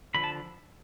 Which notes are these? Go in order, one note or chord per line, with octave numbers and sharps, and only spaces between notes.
D3 F3 B5
A5